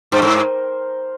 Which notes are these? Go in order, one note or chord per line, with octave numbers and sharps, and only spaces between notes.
G2 C5
G#2 A#4